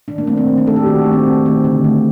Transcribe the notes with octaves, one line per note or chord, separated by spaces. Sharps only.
D#3 D4
A#3
A3 C4
C4
D#3
D4
A3 A4
G4
D#3 F#4
D4
A3
C4
D#3
A3 C4
D3
A3